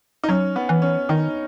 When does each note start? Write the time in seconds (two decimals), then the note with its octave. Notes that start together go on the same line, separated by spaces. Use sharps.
0.24 D#4
0.29 F#3 C#4
0.56 B3
0.69 E3
0.82 C#4
1.09 D#3 D#4